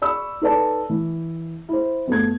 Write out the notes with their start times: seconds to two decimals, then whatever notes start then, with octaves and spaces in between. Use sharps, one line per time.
0.02 D5 B5 C#6 E6
0.41 D#4 A4 B4 C#5 D5 A5
0.90 E3
1.69 E4 C5
2.08 G1 A3 G#6